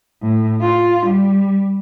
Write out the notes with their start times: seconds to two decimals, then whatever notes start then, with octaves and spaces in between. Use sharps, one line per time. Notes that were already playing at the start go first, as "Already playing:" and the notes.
0.23 A2
0.61 F4
1.07 G3